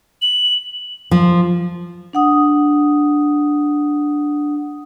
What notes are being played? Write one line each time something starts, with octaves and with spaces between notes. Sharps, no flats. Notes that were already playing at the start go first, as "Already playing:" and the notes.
F#7
F3
D4 F#5 D#6